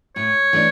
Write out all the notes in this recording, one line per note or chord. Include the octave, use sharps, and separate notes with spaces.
A2 C#5
E3 A3 D4